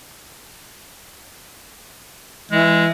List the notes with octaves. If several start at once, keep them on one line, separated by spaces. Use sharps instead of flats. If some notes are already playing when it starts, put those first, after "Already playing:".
E3 G#3